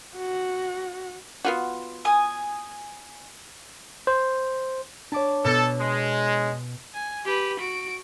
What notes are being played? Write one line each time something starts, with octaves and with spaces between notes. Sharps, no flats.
F#4
B3 F4 F#4
G#5 D#6
C5
D4 C#5 A5 D6
B2 A4
G#3
G#5
G4 B4
F#4 D7